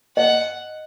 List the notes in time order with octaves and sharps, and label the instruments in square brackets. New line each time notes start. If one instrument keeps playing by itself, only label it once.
[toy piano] D#5 [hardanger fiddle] F#5